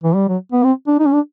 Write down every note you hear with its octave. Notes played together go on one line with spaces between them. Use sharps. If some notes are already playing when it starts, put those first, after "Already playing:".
E3
G3
F#3
B3
C4
D4
D#4
C#4
D4